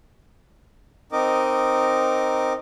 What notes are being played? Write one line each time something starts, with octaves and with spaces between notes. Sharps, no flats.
C4 D#4 A#4 D#5 D6